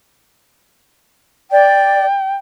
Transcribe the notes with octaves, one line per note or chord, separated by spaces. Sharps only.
D5 G5